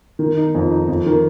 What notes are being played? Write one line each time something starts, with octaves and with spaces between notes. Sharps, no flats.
D#3
D#4
F2
D#4
F2
D#3